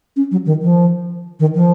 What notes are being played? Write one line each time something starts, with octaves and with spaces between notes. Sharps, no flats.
C#4
F#3
D#3
F3
D#3
F3